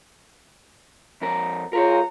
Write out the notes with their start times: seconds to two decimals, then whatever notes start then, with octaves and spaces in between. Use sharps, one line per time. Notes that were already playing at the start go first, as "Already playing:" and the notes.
1.21 F2 A#4
1.73 G#3 F4 A#4 B4 C#5 A#5